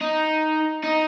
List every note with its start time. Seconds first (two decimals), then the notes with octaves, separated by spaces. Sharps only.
0.01 D#4
0.84 D#4